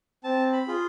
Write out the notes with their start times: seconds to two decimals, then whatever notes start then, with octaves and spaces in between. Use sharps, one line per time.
0.24 C4 A5
0.53 B5
0.68 F4 G#4